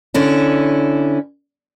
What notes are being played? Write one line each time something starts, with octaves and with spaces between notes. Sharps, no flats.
D3 C#4 E4